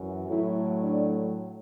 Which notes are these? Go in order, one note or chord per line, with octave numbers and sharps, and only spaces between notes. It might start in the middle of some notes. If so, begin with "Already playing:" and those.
Already playing: F#2 E3
A2 F#3 A3 E4
D4